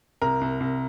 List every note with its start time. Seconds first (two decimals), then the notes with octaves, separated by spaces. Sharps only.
0.22 C2 A#4
0.41 C2
0.60 C2